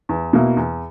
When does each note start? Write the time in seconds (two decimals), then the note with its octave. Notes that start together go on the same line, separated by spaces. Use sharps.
0.09 E2
0.33 B2 A#3 E4
0.57 E2